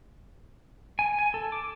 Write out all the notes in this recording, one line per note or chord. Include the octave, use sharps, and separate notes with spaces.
G#5
G#5
A4
D6